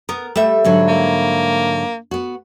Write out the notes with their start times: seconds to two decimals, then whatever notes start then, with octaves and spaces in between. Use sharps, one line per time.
0.09 B3 A#4
0.36 G3 A3 E5
0.64 G#2 D3 F#3
0.88 A#3
2.11 B3 F#4